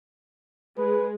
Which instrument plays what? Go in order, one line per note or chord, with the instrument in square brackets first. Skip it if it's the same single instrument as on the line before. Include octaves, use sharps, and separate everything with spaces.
[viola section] G#3 G#4 [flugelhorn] B4